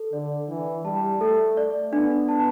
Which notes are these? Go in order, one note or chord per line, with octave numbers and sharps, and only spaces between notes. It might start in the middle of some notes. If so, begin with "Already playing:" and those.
Already playing: A4
D3 D5
E3 D4
G3 A5
A3 A4
D5
B3 D4
A5